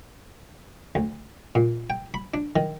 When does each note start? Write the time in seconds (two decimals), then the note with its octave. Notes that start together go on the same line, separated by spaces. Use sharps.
0.95 D2
1.55 A#2
1.90 G5
2.14 B5
2.34 D4
2.56 D#3